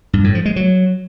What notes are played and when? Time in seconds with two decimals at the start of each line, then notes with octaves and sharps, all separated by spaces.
0.13 G2
0.24 A2
0.35 F3
0.46 G#3
0.56 F#3